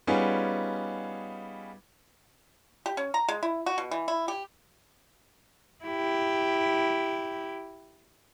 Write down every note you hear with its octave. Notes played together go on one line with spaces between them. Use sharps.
G3 B3 C#4 D#4 F4 G#4
G4
C#4
A#5
G#3
E4
F#4
B2
E3
E4
G4
E4 G4